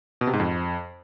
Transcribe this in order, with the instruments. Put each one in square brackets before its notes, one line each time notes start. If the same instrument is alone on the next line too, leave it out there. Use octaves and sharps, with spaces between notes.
[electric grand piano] B2
C3
G#2
F2